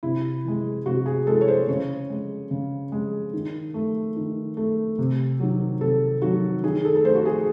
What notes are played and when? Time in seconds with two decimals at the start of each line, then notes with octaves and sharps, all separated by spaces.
0.03 C3 E4
0.45 E3 G#3
0.86 C3 F#4
1.06 G#4
1.27 E3 G#3 A4
1.41 C#5
1.48 C5
1.68 C#3 C#5
2.10 G#3
2.51 C#3
2.92 G#3
3.33 D#3
3.74 A3
4.16 D#3
4.57 A3
4.98 C3
5.40 D#3 F#3
5.81 C3 A4
6.22 D#3 F#3 F#4
6.63 D#3 G#4
6.85 A4
6.95 A4
7.04 A3 C5
7.15 F#4
7.25 G#4